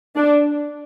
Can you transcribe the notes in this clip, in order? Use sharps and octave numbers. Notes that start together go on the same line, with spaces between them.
D4